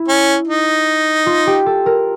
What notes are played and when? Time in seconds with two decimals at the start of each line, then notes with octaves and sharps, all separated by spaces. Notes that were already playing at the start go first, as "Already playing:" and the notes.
Already playing: E4
0.08 C#4
0.48 D#4
1.26 F4
1.47 G4
1.66 A4
1.86 A#4